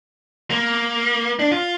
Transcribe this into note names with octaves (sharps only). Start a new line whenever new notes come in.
A#3
D4
F4